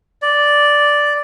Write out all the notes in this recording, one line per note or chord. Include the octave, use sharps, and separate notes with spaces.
D5